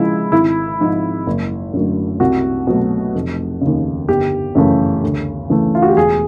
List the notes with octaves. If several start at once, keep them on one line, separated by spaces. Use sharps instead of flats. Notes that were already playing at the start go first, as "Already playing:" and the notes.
Already playing: C#3 F3 G#3 E4
G#1 E4
G#2 F3 G#3
F#1
F#2 D3 F#3 A3
C2 F#4
B2 F#3 A3
F1
D#2 C#3
G1 G4
F#2 C#3 E3 A3
D2
C#3 E3 A3
F4
F#4
G4
E1 G#4